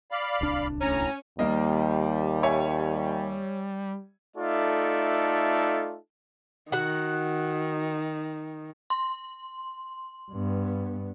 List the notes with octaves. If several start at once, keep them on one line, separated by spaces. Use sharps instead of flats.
D5 F5 B5
D1 C2 D4
A2 C#4 A#5
D#2 G3 A#3 D#5
C#5 E5 G#5
A3 D#4 F4 A4 D5 E5
D#3 F#4 F#5
C6
G2 B3